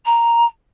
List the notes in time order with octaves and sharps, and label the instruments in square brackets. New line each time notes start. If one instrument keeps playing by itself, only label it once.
[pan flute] A#5